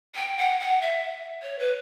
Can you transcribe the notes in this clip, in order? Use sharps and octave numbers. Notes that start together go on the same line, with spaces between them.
G5
F#5
F#5
E5
C#5
B4